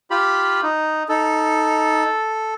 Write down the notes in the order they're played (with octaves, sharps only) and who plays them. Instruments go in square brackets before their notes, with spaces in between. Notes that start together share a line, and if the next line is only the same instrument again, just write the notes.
[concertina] F4 G4 B5
D#4
[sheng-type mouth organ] D#4 [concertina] A4